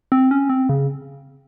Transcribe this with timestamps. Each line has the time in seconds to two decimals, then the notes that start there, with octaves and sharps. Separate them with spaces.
0.12 C4
0.31 C#4
0.50 C4
0.69 C#3